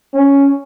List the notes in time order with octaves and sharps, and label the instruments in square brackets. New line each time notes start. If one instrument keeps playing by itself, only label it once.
[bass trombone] C#4